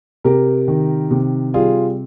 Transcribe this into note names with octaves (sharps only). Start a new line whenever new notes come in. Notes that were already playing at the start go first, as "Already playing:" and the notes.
C3 G4 A#4
D#3
C3
G3 F4 G#4